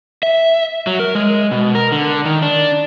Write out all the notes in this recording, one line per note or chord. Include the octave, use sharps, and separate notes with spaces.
E5
F#3
A#4
G#3
B2
A#4
D3
D#3
D4